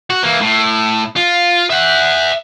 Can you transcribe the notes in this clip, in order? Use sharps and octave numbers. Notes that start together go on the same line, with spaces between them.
F#4
E3 A#3
A2
F4
E5 F#5